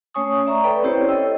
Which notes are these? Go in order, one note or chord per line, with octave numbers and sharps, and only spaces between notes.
A3 C#4 C#5 G#5 C#6 D#6
D5 E5 A#5 C#6
A4 B4 D5 G5 B5 C#6
C4 C#4 E4 G4 C5 C#5
A4 C5 C#5 D#5 G5 E6